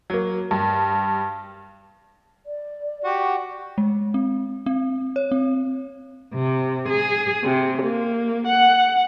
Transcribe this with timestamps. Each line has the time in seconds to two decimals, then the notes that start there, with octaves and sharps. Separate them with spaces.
0.10 F#3 A#3
0.51 G2
2.46 D5
3.04 F#4 G4
3.78 G#3
4.14 C4
4.66 C4
5.16 C#5
5.31 C4
6.34 C3
6.89 G#4
7.44 C3
7.83 A#3
8.47 F#5